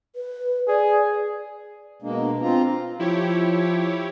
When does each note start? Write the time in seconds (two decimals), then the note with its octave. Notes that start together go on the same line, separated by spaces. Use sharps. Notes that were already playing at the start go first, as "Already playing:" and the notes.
0.16 B4
0.68 G#4 D5
2.02 B2 G#3 A#3 D4
2.42 C4 F4 A#5
3.00 F3 E4 G4 C#5